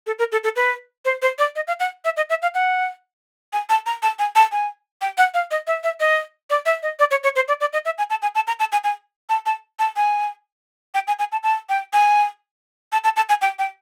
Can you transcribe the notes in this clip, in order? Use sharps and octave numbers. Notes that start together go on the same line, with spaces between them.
A4
A#4
A4
A4
B4
C5
C5
D5
D#5
F5
F#5
E5
D#5
E5
F5
F#5
G#5
A5
A#5
A5
G#5
A5
G#5
G5
F#5
F5
D#5
E5
E5
D#5
D5
E5
D#5
D5
C#5
C#5
C5
D5
D5
D#5
E5
G#5
A5
G#5
A5
A#5
A5
G#5
G#5
A5
A5
A5
G#5
G5
G#5
G#5
A5
A5
G5
G#5
A5
A5
A5
G#5
G5
G5